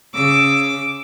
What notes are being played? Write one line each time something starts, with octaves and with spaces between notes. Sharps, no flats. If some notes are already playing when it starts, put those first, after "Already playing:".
C#3 D6 E6